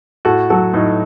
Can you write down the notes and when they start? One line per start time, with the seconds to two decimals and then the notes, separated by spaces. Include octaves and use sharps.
0.25 A2 F#4 A4
0.50 F#3 F#4 A4
0.74 A2 D#4